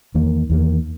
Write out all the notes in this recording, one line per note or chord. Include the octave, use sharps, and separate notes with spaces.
E2 D#3 A#3
E2 D#3 A#3